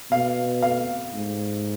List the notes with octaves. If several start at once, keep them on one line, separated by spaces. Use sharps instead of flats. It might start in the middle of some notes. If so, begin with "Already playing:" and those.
B2 F5
F5
G#2